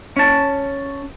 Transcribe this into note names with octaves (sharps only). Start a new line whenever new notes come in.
C#4 A5